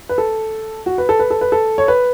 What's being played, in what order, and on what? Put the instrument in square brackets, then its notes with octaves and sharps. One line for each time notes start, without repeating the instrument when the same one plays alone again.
[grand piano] B4
A4
F#4
B4
A4
B4
A4
B4
A4
C#5
B4